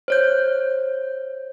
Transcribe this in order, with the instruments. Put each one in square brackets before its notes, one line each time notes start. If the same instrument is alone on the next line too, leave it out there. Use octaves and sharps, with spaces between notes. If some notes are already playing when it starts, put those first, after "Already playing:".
[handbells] C5 C#5 G6